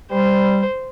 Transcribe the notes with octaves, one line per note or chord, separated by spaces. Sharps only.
G3 C5